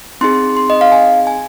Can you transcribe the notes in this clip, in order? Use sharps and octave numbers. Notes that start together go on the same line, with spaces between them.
C4 D#4 G#4 C6
C6
D#5
F5
G#5
G#5